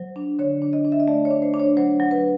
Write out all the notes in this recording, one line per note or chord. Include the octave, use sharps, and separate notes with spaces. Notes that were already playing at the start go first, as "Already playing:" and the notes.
Already playing: F#3 C5
D4
D3 C#5
D4
D#5
D4
E5
D#5
A3 D5
C#5
D4
C5
D4
C#5
F#3 C5
F#3
B4